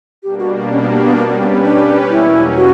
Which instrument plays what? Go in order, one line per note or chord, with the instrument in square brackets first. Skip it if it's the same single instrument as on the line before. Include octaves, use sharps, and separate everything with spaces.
[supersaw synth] B2 G3 A#3 D4 [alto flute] G4
[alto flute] F#4
C#4
B3
A#3
B3
[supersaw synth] G3 C#4 G4 B4 [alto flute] A#3
[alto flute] B3
B3
B3
D4
[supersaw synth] E2 B2 F#3 A#3 C#4 [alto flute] E4
[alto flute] F#4